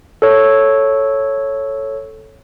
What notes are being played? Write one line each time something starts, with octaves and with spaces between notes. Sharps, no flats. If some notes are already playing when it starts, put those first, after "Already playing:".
A4 C#5